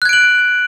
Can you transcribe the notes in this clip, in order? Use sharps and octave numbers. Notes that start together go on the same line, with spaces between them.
F#6 G#6 D7 F#7